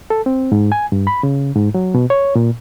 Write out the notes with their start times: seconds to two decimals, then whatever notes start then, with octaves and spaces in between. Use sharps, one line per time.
0.10 A4
0.26 C4
0.52 G#2
0.72 G#5
0.92 G2
1.07 B5
1.23 C#3
1.55 G#2
1.74 F#3
1.95 B2
2.10 C#5
2.35 A#2